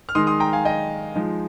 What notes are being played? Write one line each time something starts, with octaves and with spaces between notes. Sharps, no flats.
F6
D#3 G#3 D#4 C6 D#6
C6 D#6
G5 A#5
F5 G#5
D#5 G5
F3 G#3 D#4